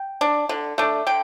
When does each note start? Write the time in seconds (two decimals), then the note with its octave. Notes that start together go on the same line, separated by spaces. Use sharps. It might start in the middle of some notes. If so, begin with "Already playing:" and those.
Already playing: G5
0.21 D4
0.49 D3
0.78 A3 D4
1.07 D3 G5